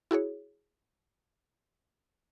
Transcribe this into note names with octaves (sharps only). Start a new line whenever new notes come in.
E4 F#4 G#4 C#5